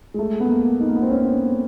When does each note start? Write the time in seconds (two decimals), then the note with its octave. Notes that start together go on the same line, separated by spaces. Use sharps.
0.14 G#3
0.19 A3
0.40 B3
0.48 A#3
0.80 D#4
0.89 A#3
0.96 B3
1.02 C4
1.11 C#4